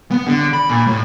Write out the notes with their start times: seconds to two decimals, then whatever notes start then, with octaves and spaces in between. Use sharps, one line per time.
0.11 B3
0.27 D3
0.53 B5
0.70 A#2
0.87 A2